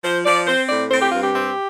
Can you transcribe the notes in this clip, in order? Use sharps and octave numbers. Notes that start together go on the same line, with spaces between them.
F3 C5
F3 D5
C4 C5
A2 D5
C4 C5
G4
G2 F4
G4
C4